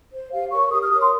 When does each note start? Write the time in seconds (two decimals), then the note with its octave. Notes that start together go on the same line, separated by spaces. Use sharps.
0.12 C5
0.31 G4 F5
0.52 A#4 C#5 C#6
0.71 G4 D#6
0.81 F6
0.91 A#4 C#5 D#6
1.01 C6